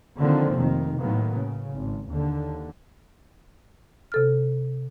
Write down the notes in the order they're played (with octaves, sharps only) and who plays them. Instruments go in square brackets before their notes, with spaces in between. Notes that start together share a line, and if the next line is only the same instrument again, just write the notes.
[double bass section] D3 D#3 F3 A#3 C4
F1 D#3
A2 D#3 F#3 A#3 B3
C#3
G#1
D#2 D3
[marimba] C3 A4 F6